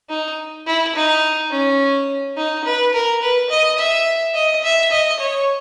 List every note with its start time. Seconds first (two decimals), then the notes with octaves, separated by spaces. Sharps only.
0.09 D#4
0.66 E4
0.95 D#4
1.51 C#4
2.37 D#4
2.65 B4
2.94 A#4
3.22 B4
3.50 D#5
3.78 E5
4.35 D#5
4.63 E5
4.91 D#5
5.20 C#5